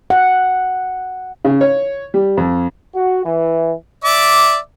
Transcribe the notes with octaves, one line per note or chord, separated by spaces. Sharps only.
F#5
C#3
C#5
G3
F2
F#4
E3
D5 E5 D6